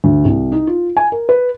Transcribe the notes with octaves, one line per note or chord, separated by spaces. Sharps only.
D2
C2
D#4
F4
G#5
A#4
B4